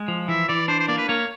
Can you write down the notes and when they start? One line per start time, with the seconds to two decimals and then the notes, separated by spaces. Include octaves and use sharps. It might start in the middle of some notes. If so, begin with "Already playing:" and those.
Already playing: G#3
0.08 F3
0.28 E3 E5
0.48 E3 D5
0.68 D4 C5
0.79 C5
0.88 A#3 D5
0.98 B4
1.08 A#3 C#5